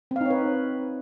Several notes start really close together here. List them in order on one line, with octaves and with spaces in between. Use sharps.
C4 F5 D#4 C#5 B4